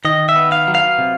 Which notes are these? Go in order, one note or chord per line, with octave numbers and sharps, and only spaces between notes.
D#3 D#5
E5
B3
F5
F#3
F5
C3